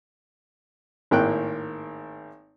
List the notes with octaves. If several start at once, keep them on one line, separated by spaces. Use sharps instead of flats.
G#1 A2 A#3 G5 F#6